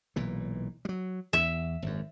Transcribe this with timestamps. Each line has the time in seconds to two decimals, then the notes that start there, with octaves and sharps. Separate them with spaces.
0.16 B1 A#2 E3
0.85 F#3 G3
1.33 E2 E5
1.82 G#1 F#2